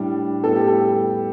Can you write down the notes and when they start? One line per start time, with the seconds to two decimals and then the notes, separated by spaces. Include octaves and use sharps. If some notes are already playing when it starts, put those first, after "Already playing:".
Already playing: A2 G3 D4
0.43 A2 G3 B3 A4
0.56 G4
0.67 A4